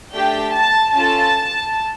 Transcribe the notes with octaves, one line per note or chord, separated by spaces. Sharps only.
A3 D4 G4 G5
A5
C#4 F4 A4 A5